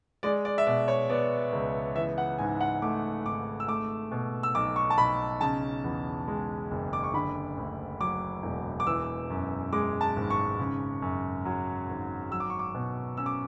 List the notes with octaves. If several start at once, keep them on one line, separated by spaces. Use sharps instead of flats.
G#3 D5
D5
E5
B2 D5
C#5
B3 D5
C#2
E3 E5
F#5
G#2 G#5
F#5
A3 D6
G#1 D6
E6
A3 D6
B2
E6
B1 D6
C#6
A5
B1 B5
C#3 A5
E2
G#3
F#1
D6
C#6
D3 B5
D2
F#3 D6
E1
D6
E3 E6
F#2
G#3 D6
A5
G#1
C#6
C#3
F#2
F#3
G#1
F#3 E6
D6
C#6
D6
B2
C#4 E6
D6